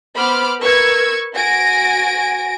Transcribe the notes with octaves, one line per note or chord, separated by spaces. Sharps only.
B3 C5 B5 D6 F6
A#4 B4 C#6 E6 G#6
F#4 G#5 A#6 D7